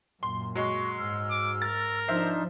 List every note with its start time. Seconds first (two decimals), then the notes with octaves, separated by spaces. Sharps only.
0.23 F#2 A#2 C6
0.56 F#3 G#3 C6 C#6
0.98 G#2 E6 F6
1.31 D6
1.62 A#4 A6
2.08 F3 D4 D#4 C5 E5 F6